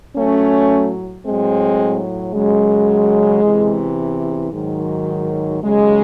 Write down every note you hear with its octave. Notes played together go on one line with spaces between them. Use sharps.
A2 F#3 A3 C#4
A2 F#3 G#3 C4
F#2 C#3 F#3 G#3
E2 C3 E3
G#2 D#3 F#3
D#2 C#3 F#3 G#3